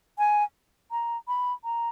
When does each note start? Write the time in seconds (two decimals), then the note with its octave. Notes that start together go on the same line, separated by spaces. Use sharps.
0.18 G#5
0.91 A#5
1.28 B5
1.64 A#5